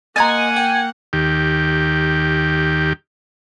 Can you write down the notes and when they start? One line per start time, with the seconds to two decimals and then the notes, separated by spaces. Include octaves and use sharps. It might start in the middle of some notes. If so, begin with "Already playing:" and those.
0.16 A#3 D#5 F#5 G#5 A#5 C6 G#6 A6
0.56 G5
1.13 D#2 G4